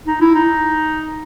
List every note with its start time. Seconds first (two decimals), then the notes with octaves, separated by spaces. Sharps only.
0.07 D#4
0.21 E4
0.35 D#4